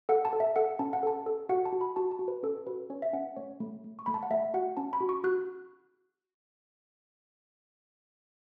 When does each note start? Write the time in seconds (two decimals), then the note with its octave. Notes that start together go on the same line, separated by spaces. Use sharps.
0.09 A4 F#5
0.25 A5
0.33 A4
0.40 E5
0.56 A4 F#5
0.79 C#4 A5
0.93 F#5
1.03 A4 A5
1.26 A4
1.49 F#4 F#5
1.65 A5
1.73 F#4
1.81 B5
1.96 F#4 A5
2.11 A5
2.19 F#4
2.28 B4
2.43 C#4 A4
2.67 F#4 B4
2.90 C#4 C#5
3.02 E5
3.13 C#4 F#5
3.36 A3 C#5
3.60 A3
3.84 A3
3.99 C#6
4.06 A3 B5
4.14 A5
4.23 F#5
4.30 A3 E5
4.54 F#4 F#5
4.77 C#4 A5
4.93 B5
5.01 F#4
5.09 C#6
5.24 F#4 F#6